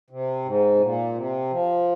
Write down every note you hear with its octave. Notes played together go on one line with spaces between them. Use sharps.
C3
G#2
C3
A#2
C3
F3